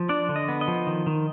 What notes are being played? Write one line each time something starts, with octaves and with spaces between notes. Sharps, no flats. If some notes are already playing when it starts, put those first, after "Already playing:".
Already playing: F3
D4 D5
D3
D#5
B3
D#5
F3
D#3
D#3